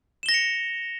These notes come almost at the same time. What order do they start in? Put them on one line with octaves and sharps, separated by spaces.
E7 G7 A#6 F7 C#7